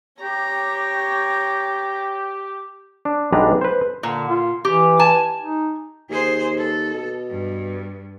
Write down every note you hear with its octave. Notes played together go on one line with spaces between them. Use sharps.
G4 C#5 A#5
D4
B1 G3 G#3 D4 B4 A#5
B4 C5
A#2 D3
F4
E3 G4
G#5 A5
D#4
D#2 G#4 C5
A4
B2
G2